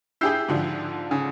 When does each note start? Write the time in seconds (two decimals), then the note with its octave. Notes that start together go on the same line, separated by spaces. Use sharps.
0.21 E4 G4 G#4 E6 G6 C7
0.48 G#2 D3 F3
1.11 C#3